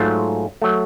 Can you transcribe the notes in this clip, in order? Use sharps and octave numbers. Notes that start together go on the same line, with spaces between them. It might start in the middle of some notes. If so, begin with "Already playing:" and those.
Already playing: G#2 F#3 A3 F4
F#3 A3